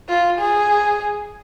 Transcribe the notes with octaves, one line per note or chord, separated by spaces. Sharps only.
F4
G#4